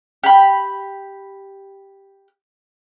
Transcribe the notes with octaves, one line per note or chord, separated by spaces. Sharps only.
G4 B5